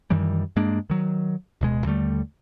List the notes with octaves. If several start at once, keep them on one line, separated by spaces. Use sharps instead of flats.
F#2 D#3 E3 G3
G2 G#3 A#3 D4
D#3 F#3
D1 B2 G#3
D#2 D3 G3 A3